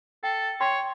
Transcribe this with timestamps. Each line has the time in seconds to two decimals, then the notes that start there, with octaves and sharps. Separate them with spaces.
0.24 A4 G5
0.60 C#5 G5 C6